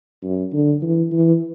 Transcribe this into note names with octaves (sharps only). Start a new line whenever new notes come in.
F#2
D3
E3
E3